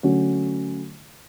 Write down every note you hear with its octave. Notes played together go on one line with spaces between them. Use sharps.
D3 F#3 A3 C#4 F#4